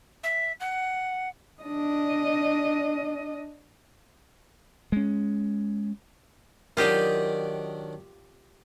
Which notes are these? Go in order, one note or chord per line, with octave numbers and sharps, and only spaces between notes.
E5
F#5
D4 D#5
G#3 C#4
D#3 F#3 D4 F4 G4 D#5